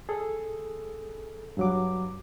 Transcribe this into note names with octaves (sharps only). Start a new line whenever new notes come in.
G#4 A4
G2 F#3 D6